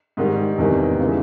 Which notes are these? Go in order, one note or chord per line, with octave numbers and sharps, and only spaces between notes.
G#2 D#3 G3
E2 C3 D#3 G3 C4
C#3 E3 G#3